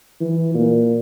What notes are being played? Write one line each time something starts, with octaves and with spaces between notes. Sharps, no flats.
E3
A#2